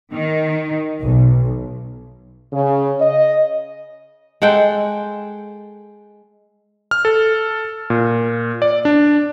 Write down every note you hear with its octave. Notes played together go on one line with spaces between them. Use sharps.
D#3
B1
C#3
D#5
G#3 A4 F#5 G5
F6
A4
A#2
D5
D4